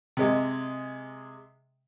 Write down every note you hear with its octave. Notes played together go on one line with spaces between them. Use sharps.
C3 G#3